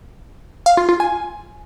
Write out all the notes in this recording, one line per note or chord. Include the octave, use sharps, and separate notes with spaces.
F5
F4
F4
G#5